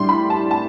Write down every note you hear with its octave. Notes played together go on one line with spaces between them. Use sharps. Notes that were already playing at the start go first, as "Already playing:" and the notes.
Already playing: A2 G3 D4 C6
B5
A5
A5